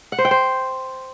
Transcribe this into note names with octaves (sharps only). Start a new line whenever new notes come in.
F#5
C5
G5
C5